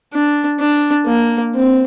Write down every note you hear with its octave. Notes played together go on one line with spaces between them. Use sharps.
D4
D4
A#3
C4